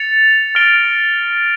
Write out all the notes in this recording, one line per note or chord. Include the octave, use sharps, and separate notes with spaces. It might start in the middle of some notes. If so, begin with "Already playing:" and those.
Already playing: A6 C#7 F7
F6 A#6 D7 G7